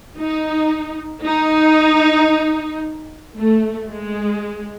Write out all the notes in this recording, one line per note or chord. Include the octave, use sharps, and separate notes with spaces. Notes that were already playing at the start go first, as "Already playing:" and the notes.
D#4
D#4
A3
G#3